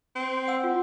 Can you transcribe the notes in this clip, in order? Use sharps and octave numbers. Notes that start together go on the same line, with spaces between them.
C4
F#5 E6
F4